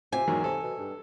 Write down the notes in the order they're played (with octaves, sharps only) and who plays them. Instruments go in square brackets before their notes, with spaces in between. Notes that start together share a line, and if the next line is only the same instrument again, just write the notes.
[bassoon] C3 [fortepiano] C4 F4 G4 [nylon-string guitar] G#5
[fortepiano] E2 G#2 F#3 [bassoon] D#3
[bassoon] C3 [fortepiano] A4
[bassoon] B2
G2